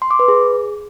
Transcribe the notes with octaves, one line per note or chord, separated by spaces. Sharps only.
C6
D6
B4
G#4